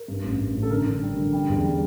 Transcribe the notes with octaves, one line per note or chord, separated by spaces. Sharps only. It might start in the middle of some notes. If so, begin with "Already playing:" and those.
Already playing: A#4
G2
A1
A1
A1
A4
D3 A#4
D3
G3
D3
G3
E2
G3